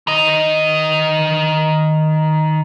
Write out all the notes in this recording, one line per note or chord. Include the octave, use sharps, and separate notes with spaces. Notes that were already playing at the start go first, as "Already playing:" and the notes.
D#3 D#5